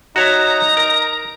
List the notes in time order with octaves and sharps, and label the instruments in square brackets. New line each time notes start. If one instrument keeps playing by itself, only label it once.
[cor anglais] D#4 [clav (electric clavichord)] F#4 C#5 E5 [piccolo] A#5
[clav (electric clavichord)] A#4